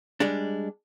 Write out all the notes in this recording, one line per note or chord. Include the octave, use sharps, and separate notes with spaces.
G3 G#3 D4